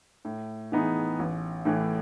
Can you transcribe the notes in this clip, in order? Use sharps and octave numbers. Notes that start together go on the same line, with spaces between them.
A2
E3 B3 D#4 G#4
A1
A2 E3 A3